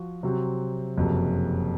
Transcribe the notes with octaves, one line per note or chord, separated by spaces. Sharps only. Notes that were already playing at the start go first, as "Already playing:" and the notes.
Already playing: F3 F#4
C3 F#3 C4 F#4
F#1 F2 C3 F#3